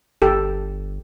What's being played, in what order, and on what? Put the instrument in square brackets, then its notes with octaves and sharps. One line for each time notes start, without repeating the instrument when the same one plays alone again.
[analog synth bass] G1 [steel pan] G4 A4 G5